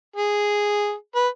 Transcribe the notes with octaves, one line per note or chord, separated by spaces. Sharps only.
G#4
B4